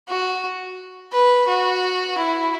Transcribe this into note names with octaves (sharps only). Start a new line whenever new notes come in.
F#4
B4
F#4
E4